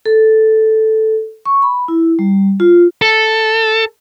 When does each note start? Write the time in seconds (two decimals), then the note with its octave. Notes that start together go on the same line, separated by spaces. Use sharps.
0.06 A4
1.46 C#6
1.62 B5
1.88 E4
2.19 G3
2.60 F4
3.02 A4